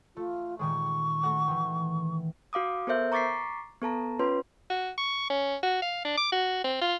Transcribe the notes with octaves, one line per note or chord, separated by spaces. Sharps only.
A3 F4
A#2 D#3 G#3 C#6
A3 F#4 F#5
D#3 E3
F#4 F5 D6 D#6
B3 A4 A#4 C5 E5 G6
A#5 C#6 D6 A6 B6 C7
B3 A4 A5 A#5
C#4 F4 B4 C#5 C6
F#4
C#6
C#4
F#4
F5
D4
D6
F#4
C4
F4